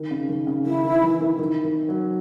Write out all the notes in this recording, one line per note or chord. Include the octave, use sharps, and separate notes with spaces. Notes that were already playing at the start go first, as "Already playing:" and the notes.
Already playing: D#3
C#3
D#3
C#3
D#3 E4
D#3
E3
D#3
D#3
D#3
F#3